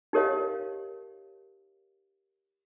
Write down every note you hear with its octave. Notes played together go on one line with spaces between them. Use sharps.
D#4 G4 A#4 C#5 D#5 F5